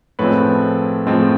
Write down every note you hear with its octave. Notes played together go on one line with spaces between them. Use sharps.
A2 F3 G#3 C4 B4 C#5
A2 F3 G#3 C4